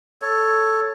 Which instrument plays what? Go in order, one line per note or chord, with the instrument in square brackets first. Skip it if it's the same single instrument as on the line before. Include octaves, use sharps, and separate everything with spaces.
[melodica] A4 C#5